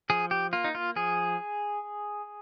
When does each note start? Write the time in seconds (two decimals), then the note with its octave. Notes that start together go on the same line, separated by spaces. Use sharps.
0.10 F3 G#4
0.31 G4
0.53 A#3 F4
0.64 D#4
0.75 F4
0.96 F3 G#4